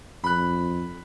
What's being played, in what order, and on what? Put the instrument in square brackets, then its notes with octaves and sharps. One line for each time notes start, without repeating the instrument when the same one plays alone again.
[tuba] F2 [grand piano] B5 F#6